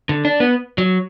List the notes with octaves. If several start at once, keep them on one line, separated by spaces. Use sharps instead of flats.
D3
D4
B3
F#3